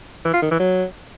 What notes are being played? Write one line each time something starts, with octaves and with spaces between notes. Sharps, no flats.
E3
F4
D#3
E3
F#3